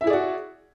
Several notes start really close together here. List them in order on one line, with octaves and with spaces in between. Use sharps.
E5 E4 G#4 D5 F#4